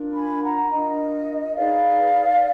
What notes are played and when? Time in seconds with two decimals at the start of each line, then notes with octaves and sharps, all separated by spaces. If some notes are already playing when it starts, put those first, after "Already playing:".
Already playing: D4 F4 A#4
0.14 G#5 B5
0.42 F#5 A#5
0.70 D4 F4 A#4 D#5
1.55 D#4 G#4 B4 D5 F5